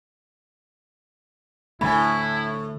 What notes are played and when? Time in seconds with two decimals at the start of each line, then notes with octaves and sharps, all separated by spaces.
1.81 A2 D3 A3 E4 G#5 B5